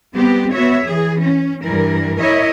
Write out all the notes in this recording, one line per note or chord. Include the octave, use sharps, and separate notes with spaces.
G3 B3 C4 G4
B3 F#4 C#5 E5
E3 G#4
C#4
G2 E3 A#4
E4 A#4 C#5 D#5 E5